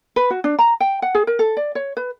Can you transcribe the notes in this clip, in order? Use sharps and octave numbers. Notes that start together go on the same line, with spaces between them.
B4
F#4
D4
A#5
G5
F#5
G#4
A#4
A4
D5
C#5
B4